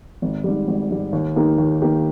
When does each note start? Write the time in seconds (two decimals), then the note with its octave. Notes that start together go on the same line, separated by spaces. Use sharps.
0.22 G#1
0.44 G#2 G3
0.68 G#1
0.91 G#2 G3
1.13 D#2
1.36 D#3 A#3 D#4 G4
1.58 D#2
1.81 D#3 A#3 D#4 G4